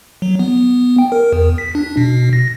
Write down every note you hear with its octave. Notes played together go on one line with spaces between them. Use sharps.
F#3
B3
G5
A#4
E2
B6
D4
B2
A#6